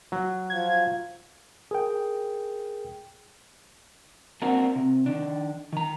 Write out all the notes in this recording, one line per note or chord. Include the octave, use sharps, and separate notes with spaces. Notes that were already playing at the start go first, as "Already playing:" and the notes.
F#3
F3 G#6
G#4 A#4 G5
A#3 C4 D4 F#4 A#4
C3
D#3 D4
D#3 A#5